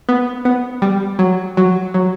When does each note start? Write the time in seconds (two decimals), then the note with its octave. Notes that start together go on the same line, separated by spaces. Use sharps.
0.09 B3
0.45 B3
0.82 G3
1.19 F#3
1.57 F#3
1.94 F#3